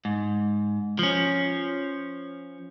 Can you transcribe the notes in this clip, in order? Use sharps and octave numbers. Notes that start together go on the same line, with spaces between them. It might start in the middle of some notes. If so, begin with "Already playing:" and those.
G#2
F3 C#4